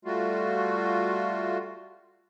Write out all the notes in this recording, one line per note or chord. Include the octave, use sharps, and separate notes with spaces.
G3 A3 F4 F#4